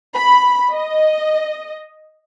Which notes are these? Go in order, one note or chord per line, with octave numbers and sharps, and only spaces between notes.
B5
D#5